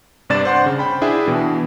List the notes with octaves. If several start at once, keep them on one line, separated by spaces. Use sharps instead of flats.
G2 C3 D4 D5 A6 E7
C5 F#5 C6
C#3
G5 B5
D4 E4 G#4 E5 G5
B2 E3